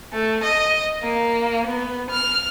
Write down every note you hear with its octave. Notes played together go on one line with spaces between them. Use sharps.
A3
D#5
A#3
B3
F6